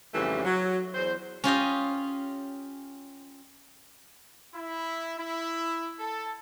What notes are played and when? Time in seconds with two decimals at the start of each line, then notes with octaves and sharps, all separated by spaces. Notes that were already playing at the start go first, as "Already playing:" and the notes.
0.14 F2 G#2 C#3 E3 G3 A3
0.45 F#3
0.95 E2 C5
1.44 C#4 F4 G4 D#5
4.54 E4
5.18 E4
6.00 A4